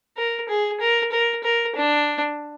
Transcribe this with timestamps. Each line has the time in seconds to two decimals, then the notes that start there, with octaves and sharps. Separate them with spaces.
0.17 A#4
0.49 G#4
0.81 A#4
1.12 A#4
1.44 A#4
1.76 D4